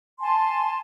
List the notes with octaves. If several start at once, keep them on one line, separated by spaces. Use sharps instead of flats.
G#5 A5 C6